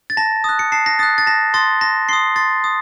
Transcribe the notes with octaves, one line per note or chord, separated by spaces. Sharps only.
A6
A5 A#6
D#6 F#6
C#7
A5 C7
A#6
D#6 F#6 A6
A6
A5 A#6
C6 D#6 A6
A5 A#6
C6 D#6 C7
C6 A6
D#6